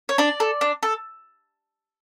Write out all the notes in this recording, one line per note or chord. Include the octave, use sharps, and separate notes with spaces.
C#5
D4 D5
A4
D4
A4